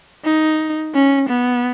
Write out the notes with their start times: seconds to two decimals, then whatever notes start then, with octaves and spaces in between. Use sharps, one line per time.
0.24 D#4
0.94 C#4
1.29 B3